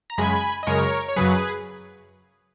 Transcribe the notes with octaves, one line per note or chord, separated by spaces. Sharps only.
A#5
F#2 C#3 G#3 G#5 B5
D#5
F#2 C#3 G#3 A#4 C#5
C#5
F#2 C#3 F#3 G#4 B4